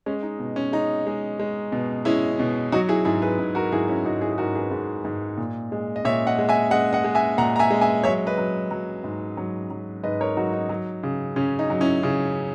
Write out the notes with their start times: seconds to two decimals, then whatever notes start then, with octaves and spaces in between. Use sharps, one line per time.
0.06 G#3 C#4
0.23 D#4
0.39 B2
0.56 C#4
0.72 G#3 D#4
1.07 G#3
1.39 G#3
1.72 B2
2.05 G#3 C#4 E4
2.39 B2
2.72 F#3 D#4 F#4
2.89 E4 G#4
3.05 G#2 E4 G#4
3.22 G#4 B4
3.39 G#2
3.55 F#4 A#4
3.72 G#2 E4 G#4
3.88 C#4 E4
4.05 G#2 D#4 F#4
4.21 E4 G#4
4.32 G#4
4.38 G#2 F#4 A#4
4.55 G#4 B4
4.71 G#2
5.05 G#2
5.38 A#2
5.72 G#3
5.96 D#5
6.05 A#2 C#5 E5
6.27 D#5 F#5
6.39 G#3
6.49 E5 G#5
6.71 G#3 D#5 F#5
6.93 D#5 F#5
7.04 G#3
7.15 E5 G#5
7.38 A#2 F#5 A#5
7.56 A#5
7.59 E5 G#5
7.71 G#3
7.81 E5 G#5
8.03 F#3 C#5 E5
8.26 B4 D#5
8.38 F#3
8.71 F#3
9.04 G#2
9.37 F#3
9.70 F#3
10.03 G#2 B4 D#5
10.21 A#4 C#5
10.37 F#3 D#4 F#4
10.53 D#4
10.69 F#3
11.03 C#3
11.36 C#3 C#4
11.59 D#4
11.70 F#3
11.81 C#4 E4
12.03 C#3